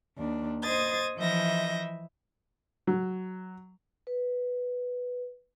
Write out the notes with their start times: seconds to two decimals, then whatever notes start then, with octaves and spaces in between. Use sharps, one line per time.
0.18 D#2 D4
0.63 C5 D#5 D#6 G#6 A6
1.18 E3 F3 D#5 E5 G6 A#6
2.87 F#3
4.07 B4